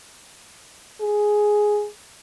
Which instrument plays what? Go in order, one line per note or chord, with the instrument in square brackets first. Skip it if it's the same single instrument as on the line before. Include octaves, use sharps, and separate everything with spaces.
[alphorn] G#4